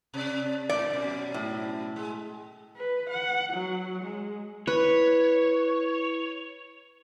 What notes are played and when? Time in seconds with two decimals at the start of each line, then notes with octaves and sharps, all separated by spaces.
0.14 C3 D5
0.69 A2 D5
0.90 F#2 B2
1.34 A2
1.96 G#3
2.77 B4
3.10 F#5
3.54 F#3
4.04 G#3
4.67 E4 B4 C#5